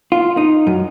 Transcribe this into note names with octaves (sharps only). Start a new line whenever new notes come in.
F4
D#4
F#2